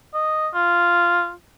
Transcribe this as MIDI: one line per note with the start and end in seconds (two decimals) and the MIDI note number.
0.14 0.48 75
0.54 1.32 65